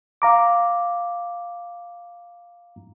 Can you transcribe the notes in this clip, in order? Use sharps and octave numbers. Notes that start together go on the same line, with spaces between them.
F5 A#5 D6